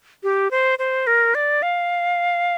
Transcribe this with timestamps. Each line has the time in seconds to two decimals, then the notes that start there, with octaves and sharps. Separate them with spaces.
0.23 G4
0.51 C5
0.79 C5
1.07 A#4
1.35 D5
1.63 F5